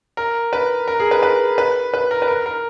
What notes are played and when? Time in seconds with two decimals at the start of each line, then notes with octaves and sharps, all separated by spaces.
0.17 A#4
0.53 B4
0.88 A#4
1.00 G#4
1.11 B4
1.23 B4
1.58 B4
1.94 B4
2.11 A#4
2.22 B4
2.28 A#4
2.46 A#4